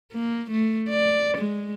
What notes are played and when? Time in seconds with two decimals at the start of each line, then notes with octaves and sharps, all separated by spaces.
0.12 A#3
0.51 A3
0.90 D5
1.38 G#3